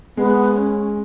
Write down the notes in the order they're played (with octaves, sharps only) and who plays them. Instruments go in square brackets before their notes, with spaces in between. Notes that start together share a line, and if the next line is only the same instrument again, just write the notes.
[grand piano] G#3 [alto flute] B3
[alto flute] C#4